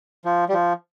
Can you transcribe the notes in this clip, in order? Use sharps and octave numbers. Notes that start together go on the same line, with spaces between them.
F3
G3
F3